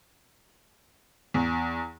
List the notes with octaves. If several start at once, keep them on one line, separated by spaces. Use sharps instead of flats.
E2